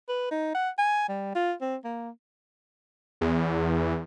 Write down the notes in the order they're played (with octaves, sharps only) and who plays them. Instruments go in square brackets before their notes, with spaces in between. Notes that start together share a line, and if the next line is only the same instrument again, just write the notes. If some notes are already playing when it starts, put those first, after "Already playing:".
[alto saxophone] B4
D#4
F#5
G#5
G3
F4
C4
A#3
[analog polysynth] E2